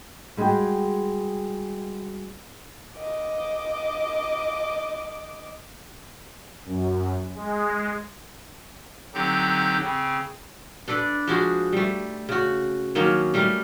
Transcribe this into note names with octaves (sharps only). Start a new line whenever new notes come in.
G3 G#3 F#4 G#4 G5
D#5 D6
F#2
G#3
D3 F#3 C4 D#4 G4 G6
C#3 C4
D4 A4 B4 D5
F3 G#3 F#4 G#4
G3 A3
C#3 F#4
D#3 F#3 A#3 C#4
G3 A3 A#4